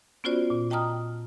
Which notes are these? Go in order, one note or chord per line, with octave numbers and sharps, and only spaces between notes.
B3 C#4 F4 F#4 C5 D5
A#2
D#5 G5 A5 A#5 D#6 F6